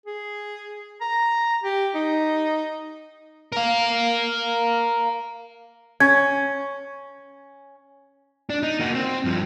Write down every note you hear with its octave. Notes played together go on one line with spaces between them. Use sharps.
G#4
A#5
G4
D#4
A#4 F5
C#4 G#6
D4
D#4
A#3 F#4
C4
G2 F3